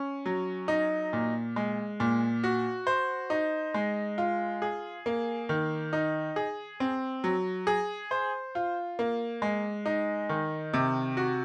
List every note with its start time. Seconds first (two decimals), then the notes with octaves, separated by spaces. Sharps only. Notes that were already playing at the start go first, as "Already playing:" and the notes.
Already playing: C#4
0.26 F#3
0.68 D#4
1.13 A#2
1.56 G#3
2.00 A#2
2.44 F#4
2.87 C5
3.30 D#4
3.74 G#3
4.18 F4
4.62 G#4
5.06 A#3
5.49 D#3
5.93 D#4
6.36 G#4
6.80 C4
7.24 F#3
7.67 G#4
8.11 C5
8.55 F4
8.99 A#3
9.42 G#3
9.86 D#4
10.29 D#3
10.73 C3
11.17 F#4